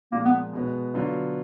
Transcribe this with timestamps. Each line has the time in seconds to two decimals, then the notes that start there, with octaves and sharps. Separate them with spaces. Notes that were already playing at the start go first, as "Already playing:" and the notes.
0.12 A#2 F3 G#3 A#3
0.25 B3
0.53 B2 G#3 B3
0.94 D3 F#3 B3 F4